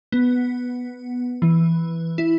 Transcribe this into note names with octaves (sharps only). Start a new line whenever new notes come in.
B3
E3
E4